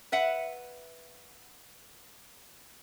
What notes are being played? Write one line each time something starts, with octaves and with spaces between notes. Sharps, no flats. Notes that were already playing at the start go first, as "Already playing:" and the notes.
B4 E5 F#5